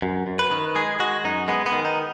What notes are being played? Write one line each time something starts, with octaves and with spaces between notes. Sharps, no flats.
F#2
F#2
B4
D#3
G#3 G#4
G#3 F#4
F#2 D#4
G#3 B3
B3
D#3
D#4